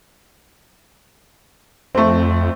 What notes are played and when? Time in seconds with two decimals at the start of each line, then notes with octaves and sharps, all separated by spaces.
1.95 F2 A3 C4